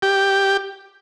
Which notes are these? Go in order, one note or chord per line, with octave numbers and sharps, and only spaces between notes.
G4